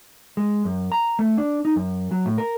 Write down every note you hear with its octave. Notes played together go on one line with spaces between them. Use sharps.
G#3
F#2
A#5
A3
D4
D#4
F#2
F#3
A2
A#4